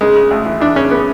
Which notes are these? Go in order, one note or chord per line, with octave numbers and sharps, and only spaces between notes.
C#3 G#3
C#3
D2
E3
E3 D4
C#3 C#4
C#3 B3